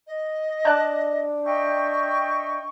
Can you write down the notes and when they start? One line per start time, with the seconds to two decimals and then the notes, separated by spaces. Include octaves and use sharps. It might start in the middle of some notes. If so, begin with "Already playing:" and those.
0.07 D#5
0.65 D4 D5 A5 F#6
1.45 D#5 E5 G5 C#6